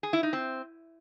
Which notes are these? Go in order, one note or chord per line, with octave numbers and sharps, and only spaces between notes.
G#4
E4
D#4
C4